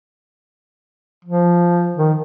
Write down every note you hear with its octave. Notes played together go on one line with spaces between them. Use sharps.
F3
D#3